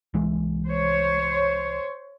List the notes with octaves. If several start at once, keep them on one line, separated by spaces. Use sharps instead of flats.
C2 E3 G#3
C5 C#5